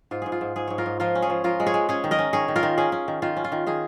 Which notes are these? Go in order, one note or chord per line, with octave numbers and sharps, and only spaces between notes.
G#2 F4
G#2 G#4
F4
G#2
G#2 G#4
G#2 C#5
F4 A#4
G#2
F3 F4 A#4
C#4
G#4 C#5
F3
F3 F4 A#4
G#3
G#4 C#5
G#3
C#4 G#4 C#5
D#3
A#4 D#5
C#4
D#3 G#4 C#5
D#3
F4 A#4
D#3
C#4 G#4
C#4
D#3
D#3 F4
C#4
F4
D#3
D#3 G#4